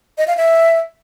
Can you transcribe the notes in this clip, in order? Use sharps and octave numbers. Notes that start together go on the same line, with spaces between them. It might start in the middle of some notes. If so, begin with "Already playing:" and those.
D#5
F5
E5